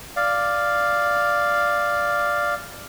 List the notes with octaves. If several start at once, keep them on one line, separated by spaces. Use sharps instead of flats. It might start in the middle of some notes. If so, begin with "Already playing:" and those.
D5 F5